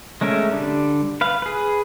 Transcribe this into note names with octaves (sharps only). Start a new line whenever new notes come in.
G#3 A3 C#4 A#4 E5
D3 G3 D4
B4 F5
G#4 B4